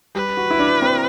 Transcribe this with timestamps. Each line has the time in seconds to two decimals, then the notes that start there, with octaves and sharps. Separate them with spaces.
0.15 G3 B4
0.37 F#4
0.51 E4
0.59 D4
0.82 C4